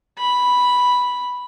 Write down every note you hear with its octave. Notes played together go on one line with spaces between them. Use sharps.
B5